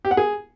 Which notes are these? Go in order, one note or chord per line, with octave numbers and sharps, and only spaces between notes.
G4
F#5
G#4